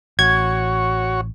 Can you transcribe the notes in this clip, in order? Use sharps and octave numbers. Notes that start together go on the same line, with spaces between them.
A1 F#4 C#5 G#6